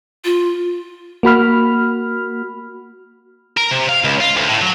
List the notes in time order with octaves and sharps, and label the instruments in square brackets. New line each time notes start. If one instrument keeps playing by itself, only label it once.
[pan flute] F4
[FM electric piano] A#3 F#4 B5 F6
[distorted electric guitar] A#4
C3
F5
C#2
F4
D2
A2
F#3